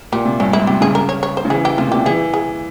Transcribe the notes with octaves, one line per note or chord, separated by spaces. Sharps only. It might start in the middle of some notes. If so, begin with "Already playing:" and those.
A#2 G3
C3
G2 C#4
G#2 E4
C3 G4
C#3 G#4
A#4
C#5
C#5
C5
C#3
E3 G#4
G4
C3 F4
A#2
C3 G4
E3 G#4
G#4